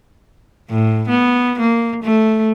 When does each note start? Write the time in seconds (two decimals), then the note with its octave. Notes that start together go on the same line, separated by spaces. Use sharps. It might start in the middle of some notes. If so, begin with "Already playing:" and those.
0.70 A2
1.09 B3
1.59 A#3
2.03 A3